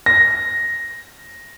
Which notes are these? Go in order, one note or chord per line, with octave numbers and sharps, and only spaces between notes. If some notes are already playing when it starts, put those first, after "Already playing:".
A#6